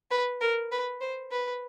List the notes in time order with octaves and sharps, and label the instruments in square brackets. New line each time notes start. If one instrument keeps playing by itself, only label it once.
[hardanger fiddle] B4
A#4
B4
C5
B4